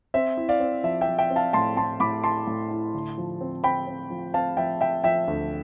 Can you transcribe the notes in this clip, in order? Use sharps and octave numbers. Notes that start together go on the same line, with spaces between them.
C4 E5
E4
D5 F5
C4
F3 E5
E5 G5
F3
E5 G5
C4
F5 A5
A2 A5 C6
A2 A5 C6
A2 B5 D6
E4 A5 C6
A2
E4
D3
F3
C4
C4 G5 B5
C4
F3
C4 F5 A5
F3 E5 G5
F3 E5 G5
F3 E5 G5
D2